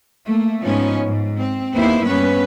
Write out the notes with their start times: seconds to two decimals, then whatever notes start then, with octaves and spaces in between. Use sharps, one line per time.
0.24 A3 A#3
0.62 G#2 F3 B3 C#4 D#4
1.04 G#2
1.37 C4
1.75 D#2 A#3 B3 E4 C5
2.05 G2 B3 C#4 B4